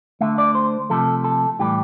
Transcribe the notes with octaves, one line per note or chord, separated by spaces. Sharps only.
D3 A3 E5
D5
C5
C3 F3 A3 A4
A4
A2 E3 G3 G4